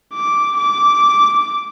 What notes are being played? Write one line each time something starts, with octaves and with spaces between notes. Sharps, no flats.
D6
D6